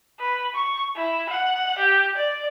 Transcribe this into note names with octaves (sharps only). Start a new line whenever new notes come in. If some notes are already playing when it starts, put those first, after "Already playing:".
B4
C#6
E4
F#5
G4
D5